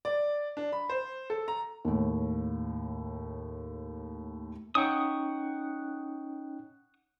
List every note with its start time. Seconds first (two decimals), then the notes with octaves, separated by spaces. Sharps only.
0.05 D5
0.57 D4
0.72 B5
0.90 C5
1.30 A4
1.48 A#5
1.85 D#2 A2
4.75 C#4 D#4 F#5 G5 C#6 D#6